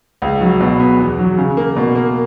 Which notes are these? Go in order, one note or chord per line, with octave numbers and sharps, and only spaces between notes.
C#2
F#3
B2
B3
E2
F#3
C#3
A#3
B2
A#3